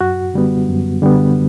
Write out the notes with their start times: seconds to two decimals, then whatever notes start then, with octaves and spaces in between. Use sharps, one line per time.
0.01 F#2 F#4
0.34 D3 G3 B3
0.68 F#2
1.02 D3 G3 B3